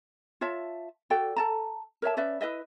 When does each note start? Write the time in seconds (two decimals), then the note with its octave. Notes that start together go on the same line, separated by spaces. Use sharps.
0.41 F4 C#5 E5 A5
1.10 F#4 A4 D5 G5
1.36 A4 A5 A#5
2.02 A#4 C#5 E5 A5
2.17 C#4 B4 D5 E5
2.41 E4 B4 D#5 E5